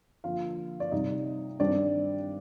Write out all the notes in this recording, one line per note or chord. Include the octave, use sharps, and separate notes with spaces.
D3 F3 A#3 F4 F5
D5
C3 G3 C4 D#4 D#5
G2 D#3 G3 C4 D4 D5